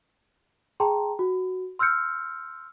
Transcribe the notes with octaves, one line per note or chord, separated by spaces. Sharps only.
G#4 G5 A5 A#5 C6
F#4
C6 E6 F6 G6 C#7